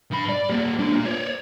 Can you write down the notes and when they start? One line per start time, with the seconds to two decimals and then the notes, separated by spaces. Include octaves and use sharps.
0.11 G2 B5
0.29 D5
0.50 G3 A#3
0.79 D4 F#4
0.92 A#3 F4
1.06 C#5 D5